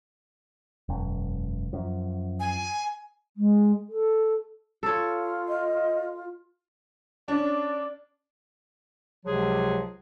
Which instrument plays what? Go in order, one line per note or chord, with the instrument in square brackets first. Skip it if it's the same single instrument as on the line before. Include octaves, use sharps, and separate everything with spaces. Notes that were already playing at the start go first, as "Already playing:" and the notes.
[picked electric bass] E1 F#2
F#2 F3
[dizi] G#5
[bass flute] G#3
A4
[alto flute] F4 [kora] A4 C#5
[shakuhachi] D#5
[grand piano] C#4 D4 [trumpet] D5
[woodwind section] C#2 C3 F3 F#3 G#4